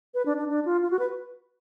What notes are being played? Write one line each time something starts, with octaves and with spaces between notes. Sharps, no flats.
B4
D4
D4
D4
F4
F4
F#4
B4